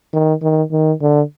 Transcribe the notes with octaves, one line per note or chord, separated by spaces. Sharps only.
D#3
D#3
D#3
D3